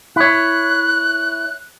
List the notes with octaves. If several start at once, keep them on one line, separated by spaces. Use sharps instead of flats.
E4 C#5 F#6